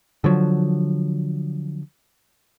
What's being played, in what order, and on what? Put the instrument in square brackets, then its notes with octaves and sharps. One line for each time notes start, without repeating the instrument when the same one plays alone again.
[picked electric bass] D3 F3 F#3